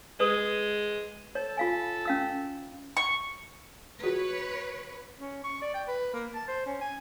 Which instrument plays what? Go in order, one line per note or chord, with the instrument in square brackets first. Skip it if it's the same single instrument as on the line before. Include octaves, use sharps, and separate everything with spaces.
[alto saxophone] G#3 [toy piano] B4 D#6
[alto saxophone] A4 [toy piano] C#5
[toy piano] F4 F5 G#5
C#4 F5 E6
[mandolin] C#6
[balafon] F4 F#4 G#4 [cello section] B4 C#5
[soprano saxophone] C#4
C#6
D5
G5
B4
A#3
A5
C5
C#4
G#5